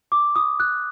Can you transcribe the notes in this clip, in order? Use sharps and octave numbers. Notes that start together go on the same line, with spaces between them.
D6
D#6
F#6